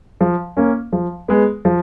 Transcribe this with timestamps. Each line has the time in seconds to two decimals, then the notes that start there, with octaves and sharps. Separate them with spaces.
0.21 F3
0.57 A#3 C#4
0.92 F3
1.28 G#3 B3
1.65 F3